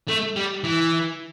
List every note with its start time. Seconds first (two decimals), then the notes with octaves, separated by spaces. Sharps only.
0.08 A3
0.36 G3
0.64 E3